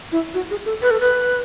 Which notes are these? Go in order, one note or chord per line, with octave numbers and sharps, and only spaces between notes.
E4
F#4
G#4
A4
B4
A4
B4